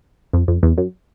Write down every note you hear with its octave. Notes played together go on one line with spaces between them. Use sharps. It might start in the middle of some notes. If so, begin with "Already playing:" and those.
F2
F2
E2
F#2